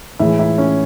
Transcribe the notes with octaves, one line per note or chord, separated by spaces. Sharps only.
A2 E3 G#3 E4 E5
E4 E5
C#4 C#5